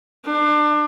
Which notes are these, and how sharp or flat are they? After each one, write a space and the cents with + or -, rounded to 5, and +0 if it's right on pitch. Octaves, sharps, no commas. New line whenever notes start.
D4 +30